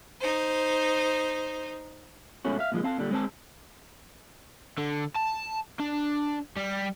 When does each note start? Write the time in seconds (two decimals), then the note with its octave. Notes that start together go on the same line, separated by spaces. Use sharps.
0.20 D#4 C5
2.45 G#2 B2 A3 C#4 F#4
2.59 E5 F5
2.72 A#2 F3 G#3
2.83 C4 F5 A5
2.97 A#2 D3 G3
3.11 G#3 C4 A5
4.78 D3
5.16 A5
5.79 D4
6.57 G3